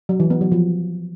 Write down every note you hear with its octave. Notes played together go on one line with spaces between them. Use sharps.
F#3
E3
B3
F#3
F3